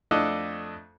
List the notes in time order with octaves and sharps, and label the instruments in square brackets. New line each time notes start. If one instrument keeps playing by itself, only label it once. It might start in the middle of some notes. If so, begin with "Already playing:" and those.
[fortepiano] F2 A3 D4 A4 D#5 F#6